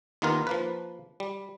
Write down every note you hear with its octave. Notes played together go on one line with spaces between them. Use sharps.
D#2 D#3 B3 F4 A#4 F5
F3 A#3 B4
G3